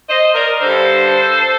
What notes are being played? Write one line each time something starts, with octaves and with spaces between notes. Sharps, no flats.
C5 D#5
A#4 D5
G2 D3 A4 C5